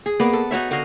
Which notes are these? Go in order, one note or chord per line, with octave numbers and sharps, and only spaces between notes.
G#4
A#3 B3 D5
A4
D#4 F#4 C#5 E5
D3 F#4 D#5 F5